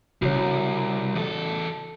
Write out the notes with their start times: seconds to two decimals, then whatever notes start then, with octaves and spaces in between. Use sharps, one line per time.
0.22 C2 C#3 D4 F#4 C#5
1.15 E2 A4